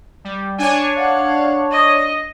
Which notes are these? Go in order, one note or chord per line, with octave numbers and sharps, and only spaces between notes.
G3
D4 C#5 G#5
F5 F#5
D#5